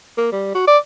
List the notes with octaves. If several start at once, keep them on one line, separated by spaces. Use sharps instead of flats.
A#3
G3
F#4
D5